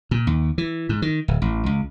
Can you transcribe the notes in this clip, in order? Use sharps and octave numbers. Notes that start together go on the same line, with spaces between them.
A#2
D#2
E3
G#2
D#3
D1
A1
C#2